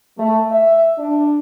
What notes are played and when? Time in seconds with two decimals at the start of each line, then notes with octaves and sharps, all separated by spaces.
0.19 A3
0.51 E5
0.98 D4